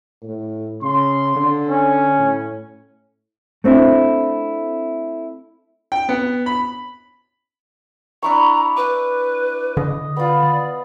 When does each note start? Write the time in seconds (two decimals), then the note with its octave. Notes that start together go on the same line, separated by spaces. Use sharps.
0.23 A2
0.82 C#3 C6
1.36 D3
1.69 C#4
2.19 A2
3.64 A3 C4 D4 E4
5.92 G5
6.09 B3
6.46 B5
8.23 D4 E4 A#5 C#6
8.77 B4 D6
9.77 D3 D#5
10.16 B3 F4 D5